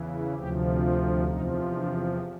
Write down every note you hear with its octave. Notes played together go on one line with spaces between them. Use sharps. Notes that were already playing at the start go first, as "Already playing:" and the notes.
Already playing: E2 C#3 E3
D2 C3 F3 G4
F4
E2 C3 F3 D#4
D4